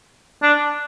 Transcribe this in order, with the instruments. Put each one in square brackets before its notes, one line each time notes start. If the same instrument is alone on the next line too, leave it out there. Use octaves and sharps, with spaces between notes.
[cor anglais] D4